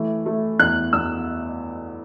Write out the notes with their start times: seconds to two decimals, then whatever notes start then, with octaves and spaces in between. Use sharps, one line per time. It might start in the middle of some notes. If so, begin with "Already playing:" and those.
Already playing: E3 A3
0.26 A3
0.59 E2 F#6
0.93 E2 E6